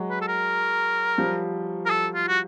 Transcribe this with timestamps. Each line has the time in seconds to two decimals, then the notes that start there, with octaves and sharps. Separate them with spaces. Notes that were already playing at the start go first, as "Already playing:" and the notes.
Already playing: F#3 G#3
0.10 B4
0.21 A4
0.27 A#4
1.18 F3 G3
1.86 A#4
1.90 A4
2.14 F4
2.28 F#4